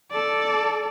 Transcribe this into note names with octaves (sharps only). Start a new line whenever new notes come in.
A4 D5